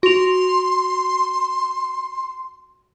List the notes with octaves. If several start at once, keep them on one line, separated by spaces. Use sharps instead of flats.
F#4 C6 F7